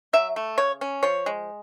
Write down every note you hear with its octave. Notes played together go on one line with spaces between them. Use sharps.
F#3 E5
A3
C#3 C#5
C#4
F3 C#5
G#3